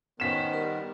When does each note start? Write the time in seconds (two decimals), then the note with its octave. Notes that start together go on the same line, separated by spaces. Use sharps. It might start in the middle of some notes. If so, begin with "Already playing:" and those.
0.20 D#3 B3 C#4 C5 B6 E7
0.53 G3 A#4